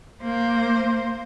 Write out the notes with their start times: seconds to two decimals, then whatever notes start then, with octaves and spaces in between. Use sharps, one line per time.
0.23 A#3 C5